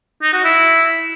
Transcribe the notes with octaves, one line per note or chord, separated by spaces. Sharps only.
D#4
F#4
E4